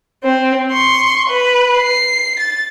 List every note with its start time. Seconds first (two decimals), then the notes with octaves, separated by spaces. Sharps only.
0.24 C4 C5
0.72 C6 C#6
1.30 B4
1.77 C7
2.39 A6